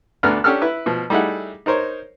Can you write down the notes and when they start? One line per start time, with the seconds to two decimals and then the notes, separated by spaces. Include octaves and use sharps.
0.23 D2 D3 B3 D4 A#5 F6
0.44 C#4 D4 G4 A4 E6 F6
0.62 E4 B4 E6
0.86 B2 F3
1.10 G3 A3 D#4 E4 G#4 F#5
1.66 D#4 A#4 C5 C#5